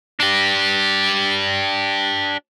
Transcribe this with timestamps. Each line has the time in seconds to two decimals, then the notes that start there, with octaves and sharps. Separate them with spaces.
0.20 D4 G4